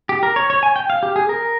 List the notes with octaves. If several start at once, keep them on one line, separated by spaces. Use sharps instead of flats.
G4
A#4
C#5
C#5
G#5
G5
F5
G4
G#4
A#4